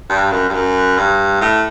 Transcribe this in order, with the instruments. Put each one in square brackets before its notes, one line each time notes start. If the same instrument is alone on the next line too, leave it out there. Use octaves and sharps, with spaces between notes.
[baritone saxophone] G2
F#2
G2
F#2
G2
A2